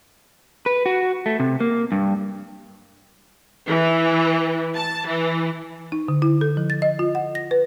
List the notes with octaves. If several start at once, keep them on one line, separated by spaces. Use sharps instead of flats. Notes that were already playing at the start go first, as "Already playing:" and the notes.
B4
F#4
A3
C3
A#3
G2
E3
A5
E3
D#4
D3
E4
A4
F3
A6
D#5
F4
F#5
A#6
B4